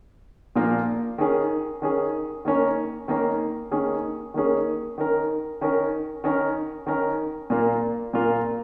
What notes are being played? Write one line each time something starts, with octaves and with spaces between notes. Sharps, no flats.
A#2 F3 A#3 F4 A#4
D#3 C#4 G#4
D#3 C#4 G#4
D#3 A#3 C#4 A#4
D#3 A#3 C#4 A#4
D#3 A#3 C#4 G#4
D#3 A#3 C#4 G#4
D#3 C#4 A#4
D#3 C#4 A#4
D#3 C#4 A#4
D#3 C#4 A#4
A#2 A#3 F4
A#2 A#3 F4